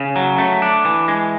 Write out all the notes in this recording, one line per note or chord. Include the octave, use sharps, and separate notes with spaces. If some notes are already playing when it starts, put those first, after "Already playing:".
Already playing: C#3
F#3
A3
D4
E3
G#3